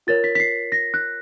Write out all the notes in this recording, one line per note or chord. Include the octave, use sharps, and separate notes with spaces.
F4 A#4 C#5 A6
B6
B6
C7
A#6
F#6